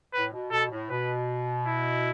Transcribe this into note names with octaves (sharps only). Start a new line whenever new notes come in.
A2 B4
B2
B2 A4
A2
B2 B4
E4